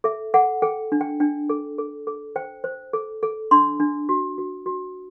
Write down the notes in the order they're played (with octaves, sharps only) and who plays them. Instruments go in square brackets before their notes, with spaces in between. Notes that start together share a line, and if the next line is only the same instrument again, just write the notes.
[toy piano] A4 E5
A4 F#5
A4 G5
D4
G5
D4 G5
A4
A4
A4
C5 G5
C5
A4
A4
D4 C6
D4
F#4
F#4
F#4